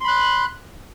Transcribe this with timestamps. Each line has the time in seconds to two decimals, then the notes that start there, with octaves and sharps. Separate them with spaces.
0.01 C6
0.04 B5
0.08 F#6